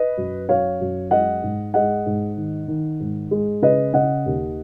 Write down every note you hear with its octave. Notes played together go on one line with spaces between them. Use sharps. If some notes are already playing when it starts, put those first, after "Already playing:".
Already playing: B4 D#5
F#2
F#2 C#5 F5
F#2
G#3 D#5 F#5
G#2
G#3 D#5 F#5
G#2
D#3
D#3
G#2
G#3
C#3 B4 D#5
C#3 D#5 F#5
D#2